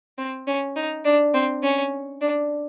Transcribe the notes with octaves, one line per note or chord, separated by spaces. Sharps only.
C4
C#4
D#4
D4
C4
C#4
D4